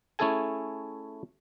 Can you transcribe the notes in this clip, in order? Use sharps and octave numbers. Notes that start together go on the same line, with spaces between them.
A3 C#4 E4 G#4 A4 G#5